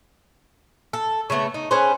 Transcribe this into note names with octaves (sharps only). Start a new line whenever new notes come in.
A4
C#3 G3 A3 B3
D#4
C#4 G#4 B4 C5